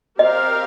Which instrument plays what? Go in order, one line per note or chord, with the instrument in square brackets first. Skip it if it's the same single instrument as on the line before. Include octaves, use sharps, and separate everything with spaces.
[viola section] C4 G4 A#4 F5 [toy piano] D#5